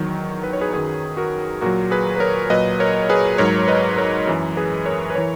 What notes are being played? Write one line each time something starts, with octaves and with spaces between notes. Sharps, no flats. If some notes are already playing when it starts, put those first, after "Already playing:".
Already playing: E2 D#3 F#3
B4
C#5
G#4 B4
F#2 D#3 F#3 G#4 B4
F#4 A#4
A#2 F#3 F#4 A#4
G#4 B4
B4
A#4 C#5
A#2 F#3 B4 D#5
A#4 C#5
G#4 B4
G#2 F#3 A#4 C#5
B4 D#5
A#4 C#5
F#2 E3
G#4 B4
A#4 C#5
B4
E3 A#4 C#5